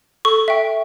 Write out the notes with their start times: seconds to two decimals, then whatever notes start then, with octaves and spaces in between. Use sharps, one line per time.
0.25 A4 C#6
0.48 E5 G5